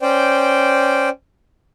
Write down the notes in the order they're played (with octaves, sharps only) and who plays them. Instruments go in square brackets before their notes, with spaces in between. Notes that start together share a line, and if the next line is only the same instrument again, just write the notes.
[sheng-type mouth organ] C#4 C5 D5 G5